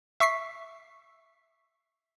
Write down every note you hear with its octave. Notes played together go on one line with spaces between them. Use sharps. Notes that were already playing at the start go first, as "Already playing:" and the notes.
E5 C#6 B6 C7